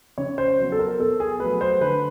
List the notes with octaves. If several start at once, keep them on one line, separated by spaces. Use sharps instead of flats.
C#3 C#5
C5
F#3 B3
A4
A#4
B2 A4
G#4
F#3 A3 B4
C5
D3 B4